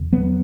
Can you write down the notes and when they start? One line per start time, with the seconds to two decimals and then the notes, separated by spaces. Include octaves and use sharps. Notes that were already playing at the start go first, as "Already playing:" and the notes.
Already playing: E2 C#3
0.12 F#3 B3